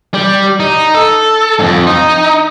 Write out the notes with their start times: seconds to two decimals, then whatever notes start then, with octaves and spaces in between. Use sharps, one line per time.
0.14 G3
0.60 D#4
0.94 A4
1.59 F2 G#2
1.87 D#4